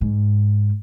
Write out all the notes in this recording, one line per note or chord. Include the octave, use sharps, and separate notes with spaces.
G#2